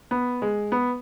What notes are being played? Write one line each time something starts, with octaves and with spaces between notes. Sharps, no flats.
B3
G#3
B3